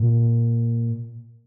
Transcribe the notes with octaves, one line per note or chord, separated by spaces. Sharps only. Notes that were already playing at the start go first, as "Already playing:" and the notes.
Already playing: A#2